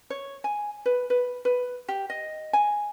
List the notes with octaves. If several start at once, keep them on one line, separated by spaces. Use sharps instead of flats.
C#5
G#5
B4
B4
B4
G4
D#5
G#5